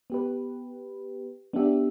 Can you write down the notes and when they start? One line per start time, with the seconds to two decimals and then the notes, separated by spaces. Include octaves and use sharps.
0.10 B3 G4 B4
1.53 B3 D4 G4 E5